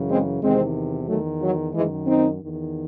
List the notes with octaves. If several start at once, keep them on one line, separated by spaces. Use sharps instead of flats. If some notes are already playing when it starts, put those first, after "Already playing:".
Already playing: F#2 C#3 E3
G#3 C4
E2 C3 D#3 G#3 C4
E2 D#3 F#3 A3
F#3
F#2 D#3 E3 G#3
C4 D#4
E2 D#3